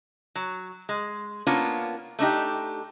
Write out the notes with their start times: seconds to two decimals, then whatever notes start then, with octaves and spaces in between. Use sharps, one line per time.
0.35 F#3
0.89 G#3
1.47 A#3 B3 C#4 D4 F4
2.19 A3 D4 D#4 G4